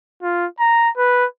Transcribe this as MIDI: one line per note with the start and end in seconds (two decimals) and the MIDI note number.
0.23 0.46 65
0.60 0.90 82
0.98 1.26 71